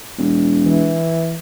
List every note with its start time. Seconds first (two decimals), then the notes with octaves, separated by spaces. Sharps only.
0.19 E1
0.66 E3